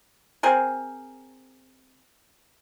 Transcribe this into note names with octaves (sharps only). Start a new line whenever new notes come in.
C4 G#4 A#4